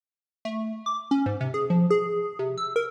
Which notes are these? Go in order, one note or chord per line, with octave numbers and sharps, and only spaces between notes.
A3
D6
C#4
G#2
C3
G#4
F3
G#4
C3
E6
A#4